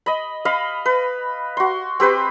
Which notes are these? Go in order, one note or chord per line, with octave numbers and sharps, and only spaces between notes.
D#5 B5
D#5 F5 B5
B4
F#4 C6
C4 G4 B4 C5